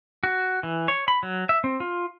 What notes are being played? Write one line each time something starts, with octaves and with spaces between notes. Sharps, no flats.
F#4
E3
C#5
B5
F#3
E5
C4
F4